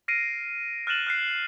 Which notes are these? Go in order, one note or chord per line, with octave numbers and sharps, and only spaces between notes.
F6 A#6 C7 D7 D#7
F6 F#6 A6 D#7 E7 F#7
F6 F#6 C7